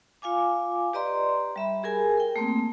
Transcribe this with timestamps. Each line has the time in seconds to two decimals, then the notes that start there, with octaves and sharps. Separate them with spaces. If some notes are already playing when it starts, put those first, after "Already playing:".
0.22 F4 F5 G#5 D6
0.93 G4 B4 D5 D#5 A#5 C6
1.56 G3 E5 B5
1.83 G4 G#4 A#4 G#5
2.17 A#4 G5
2.36 A3 A#3 C4